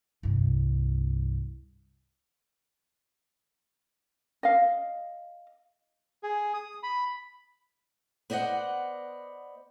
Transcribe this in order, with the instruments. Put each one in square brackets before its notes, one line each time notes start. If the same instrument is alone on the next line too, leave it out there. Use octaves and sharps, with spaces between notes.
[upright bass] C2 G2
[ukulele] D#5 F5
[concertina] G#4
D#6
B5
[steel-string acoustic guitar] B3 C5 D5 D#5 F#5